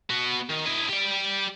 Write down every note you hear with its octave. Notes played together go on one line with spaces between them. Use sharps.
B3 F#4
D#3
E4 D#5
G4 D5